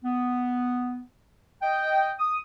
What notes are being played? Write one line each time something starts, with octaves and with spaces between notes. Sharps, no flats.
B3
D#5 G5
D#6